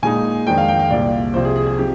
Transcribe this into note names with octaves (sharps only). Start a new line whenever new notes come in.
A#2 G#3 D#4 G#5
F2 D#3 G#3 D4 G5
F5
G5
F5
C2 A#2 G3 D5
C2 C3 F3 C5
G#4
G#4
G#4
F3 C4 D#4 G4